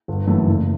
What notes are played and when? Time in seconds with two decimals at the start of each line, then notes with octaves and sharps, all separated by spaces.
0.08 G1
0.27 F#2 E3 A3
0.47 F#1